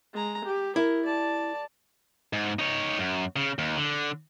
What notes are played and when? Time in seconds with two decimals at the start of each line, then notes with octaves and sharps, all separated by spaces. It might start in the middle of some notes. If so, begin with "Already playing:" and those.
0.14 G#3 A#5
0.45 G4
0.76 E4 A#4
1.05 D5 A5
2.33 G#2
2.59 D#4 C#5
2.99 F#2
3.36 C#3
3.59 D#2
3.77 D3